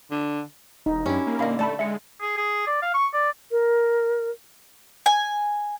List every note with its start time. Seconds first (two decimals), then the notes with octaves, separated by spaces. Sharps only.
0.11 D3
0.86 E1 D#4
1.06 F#2 C#4 D4 E4 G4 C#5
1.27 A#3
1.39 A#2 D3 D#5 F5 B5
1.59 A3 A4 D5 A5 B5
1.79 G#3 E5 C#7
2.21 G#4
2.37 G#4
2.67 D5
2.82 F5
2.94 C#6
3.14 D5
3.51 A#4
5.06 G#5